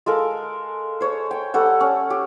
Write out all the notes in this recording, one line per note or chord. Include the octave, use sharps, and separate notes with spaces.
G#3 A4 A#4 F5
C5 C#5
G5
G3 A4 C#5 F#5
C#4
G4